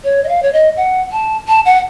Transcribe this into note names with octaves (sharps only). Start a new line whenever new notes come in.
C#5
D#5
F5
C#5
D#5
F#5
A5
A5
F#5